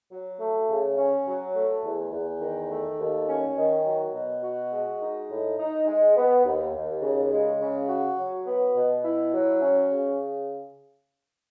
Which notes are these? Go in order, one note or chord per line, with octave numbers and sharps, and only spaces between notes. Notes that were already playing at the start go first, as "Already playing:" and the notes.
F#3
A3
C#3
C#4
F#3
A3
E2
E2
D#3
A3
D#2
C#4
D#3
F#3
B2
F#4
G#3
D#4
A2
D#4
G#3
B3
D#2
D#2
C#3
G#3
C#3
F#4
F#3
B3
B2
E4
F#3
C#4
C#3